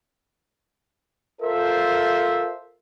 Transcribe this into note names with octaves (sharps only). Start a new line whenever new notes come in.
F4 A4 A#4 C5 E5